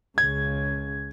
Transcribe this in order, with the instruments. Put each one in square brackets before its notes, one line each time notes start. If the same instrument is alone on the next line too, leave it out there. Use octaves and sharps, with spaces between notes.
[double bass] C#2 C#3 [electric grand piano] G#6